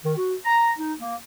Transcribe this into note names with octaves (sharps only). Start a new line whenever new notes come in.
D#3
F#4
A#5
D#4
A#3